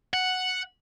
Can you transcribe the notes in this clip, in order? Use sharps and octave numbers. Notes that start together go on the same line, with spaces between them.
F#5